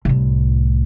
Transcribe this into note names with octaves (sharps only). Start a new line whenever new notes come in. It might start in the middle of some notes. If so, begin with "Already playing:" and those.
C2 A2